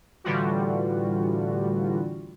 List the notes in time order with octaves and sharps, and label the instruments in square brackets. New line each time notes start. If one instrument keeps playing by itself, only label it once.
[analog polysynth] A2 D3 E3 G3 F4 F#4